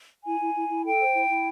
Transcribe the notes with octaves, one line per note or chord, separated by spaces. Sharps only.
E4 G#5
E4
E4
E4
A4 G5
C5
E4
E4